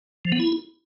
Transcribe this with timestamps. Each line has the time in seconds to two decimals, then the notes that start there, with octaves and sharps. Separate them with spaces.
0.25 F3
0.32 B3
0.40 E4